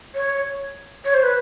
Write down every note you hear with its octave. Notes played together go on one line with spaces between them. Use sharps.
C#5
C#5
C5
B4